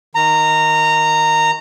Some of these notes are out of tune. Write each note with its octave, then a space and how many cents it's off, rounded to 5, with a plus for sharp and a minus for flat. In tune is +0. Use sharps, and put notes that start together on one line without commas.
D#3 +0 A#5 -15